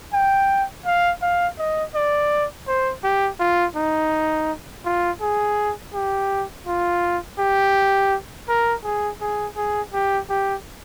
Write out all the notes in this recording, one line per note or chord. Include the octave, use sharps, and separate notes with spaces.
G5
F5
F5
D#5
D5
C5
G4
F4
D#4
F4
G#4
G4
F4
G4
A#4
G#4
G#4
G#4
G4
G4